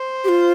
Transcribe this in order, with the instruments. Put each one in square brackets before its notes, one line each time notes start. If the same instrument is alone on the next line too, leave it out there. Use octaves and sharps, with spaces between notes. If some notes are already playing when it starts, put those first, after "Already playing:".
Already playing: [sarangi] C5
[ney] G4
F4